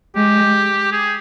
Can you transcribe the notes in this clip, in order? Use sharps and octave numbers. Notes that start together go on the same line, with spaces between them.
G#3 G4
G#4